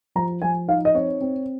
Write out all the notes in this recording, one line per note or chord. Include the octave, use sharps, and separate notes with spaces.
F3 A#5
F3 G#5
D#4 F5
D#5
C4 C#5
C4